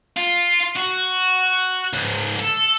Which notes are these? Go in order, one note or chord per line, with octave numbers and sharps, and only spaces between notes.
F4
F#4
C#2 G#2
A4